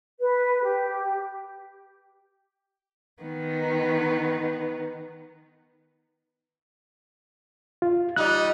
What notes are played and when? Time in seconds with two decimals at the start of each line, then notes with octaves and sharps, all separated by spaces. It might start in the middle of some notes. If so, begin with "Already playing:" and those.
0.21 B4
0.63 G4
3.23 D#3 B3
7.82 F4
8.16 G3 D#4 F#6